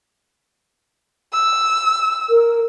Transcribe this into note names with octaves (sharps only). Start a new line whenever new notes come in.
E6
A#4